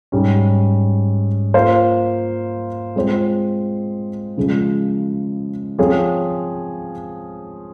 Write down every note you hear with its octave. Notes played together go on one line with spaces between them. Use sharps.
G#2 G3 C#4
A#3 F4 C5 F5
G#3 C4 F4 C5
C#3 F3 G#3
F3 C4 F4 G#4 C#5